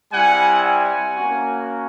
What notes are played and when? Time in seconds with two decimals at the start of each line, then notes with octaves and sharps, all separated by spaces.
0.13 G3 C4 E4 F#5 G#5
0.65 F#5 G#5
1.17 A#3 C#4 F#4